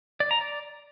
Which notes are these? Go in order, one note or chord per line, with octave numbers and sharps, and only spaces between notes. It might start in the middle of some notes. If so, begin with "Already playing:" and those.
D5
A#5
D5